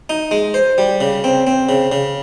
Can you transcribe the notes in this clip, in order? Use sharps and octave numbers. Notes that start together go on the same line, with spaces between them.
D#4
G#3
C5
G3
C#3
C4
C4
C#3
C#3